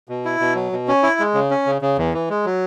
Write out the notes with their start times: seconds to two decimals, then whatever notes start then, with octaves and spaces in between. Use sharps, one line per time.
0.09 B2
0.25 E4
0.40 B2
0.55 F#3
0.72 B2
0.88 C#4
1.03 E4
1.20 G#3
1.34 C#3
1.51 C#4
1.66 C#3
1.82 C#3
1.98 E2
2.13 E3
2.30 G#3
2.46 F#3